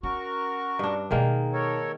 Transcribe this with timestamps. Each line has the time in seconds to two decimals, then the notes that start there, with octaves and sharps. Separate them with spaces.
0.03 C#4 F#4 A#4 C#6
0.79 G2 D4
1.11 B2 D#3 G#3 A#3 D#4
1.53 A4 A#4 C#5